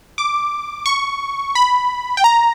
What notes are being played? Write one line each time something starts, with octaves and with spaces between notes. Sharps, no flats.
D6
C#6
B5
G5
A#5